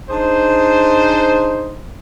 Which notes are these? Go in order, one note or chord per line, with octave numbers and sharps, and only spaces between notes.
D4 D#4 G#4 C5